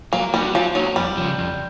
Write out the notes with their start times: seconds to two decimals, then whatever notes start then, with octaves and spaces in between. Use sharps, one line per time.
0.13 F#3 A#3
0.34 G3 A#3 D#4 F#4
0.55 F3 F#3
0.75 F#3 A#3 D#4 F#4
0.96 F2 G3
1.17 C#3 F3
1.38 F2